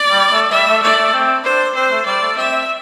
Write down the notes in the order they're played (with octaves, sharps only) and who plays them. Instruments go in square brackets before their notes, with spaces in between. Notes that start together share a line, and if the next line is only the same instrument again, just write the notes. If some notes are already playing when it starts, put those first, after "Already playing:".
Already playing: [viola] D5
[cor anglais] G3
A3
[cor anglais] G3 [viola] E5
[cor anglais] A3
[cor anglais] A3 [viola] D5
[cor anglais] A3
C4
[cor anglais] D4 [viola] C5
[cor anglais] C4 [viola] C5
[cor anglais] A3
[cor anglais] G3 [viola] D5
[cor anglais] A3
[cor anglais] C4 [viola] E5